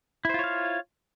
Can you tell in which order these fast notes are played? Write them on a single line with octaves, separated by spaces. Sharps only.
E4 C5 F4 C#5 F5